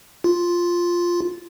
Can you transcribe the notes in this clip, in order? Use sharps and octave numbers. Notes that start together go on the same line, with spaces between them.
F4